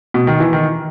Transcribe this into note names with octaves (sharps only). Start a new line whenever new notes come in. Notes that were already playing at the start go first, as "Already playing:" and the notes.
B2
D#3
E3
D#3